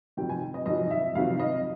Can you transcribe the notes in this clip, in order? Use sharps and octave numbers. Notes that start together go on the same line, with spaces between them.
F2 C3 D#3 F#3 G5
G#5
D#5
F2 C3 D#3 F#3 D#5
E5
F2 C3 D#3 F#3 F5
D#5